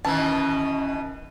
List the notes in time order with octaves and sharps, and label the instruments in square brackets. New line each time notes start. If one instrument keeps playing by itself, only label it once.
[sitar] B2 D#3 E3 [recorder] C#4 [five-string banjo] A5